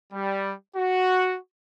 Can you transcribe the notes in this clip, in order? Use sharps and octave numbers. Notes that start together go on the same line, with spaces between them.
G3
F#4